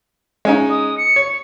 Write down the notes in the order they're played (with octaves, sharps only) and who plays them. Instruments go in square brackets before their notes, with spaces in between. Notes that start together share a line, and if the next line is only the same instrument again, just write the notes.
[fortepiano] G#3 C#4 D#4
[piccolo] D#6
C#7
[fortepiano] C#5